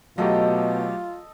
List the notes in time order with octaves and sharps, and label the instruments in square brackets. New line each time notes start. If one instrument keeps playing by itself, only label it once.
[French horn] B2 [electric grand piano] F#3 A3 G4 [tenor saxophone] F4 [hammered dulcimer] A4 D#5